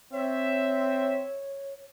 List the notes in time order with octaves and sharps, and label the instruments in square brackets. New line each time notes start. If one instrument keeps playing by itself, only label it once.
[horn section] C4 E5 [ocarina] C#5